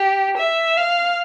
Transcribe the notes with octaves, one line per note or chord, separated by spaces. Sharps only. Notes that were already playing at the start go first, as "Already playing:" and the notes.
Already playing: G4
E5
F5